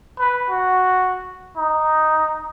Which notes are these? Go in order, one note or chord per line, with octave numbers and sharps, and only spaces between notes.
B4
F#4
D#4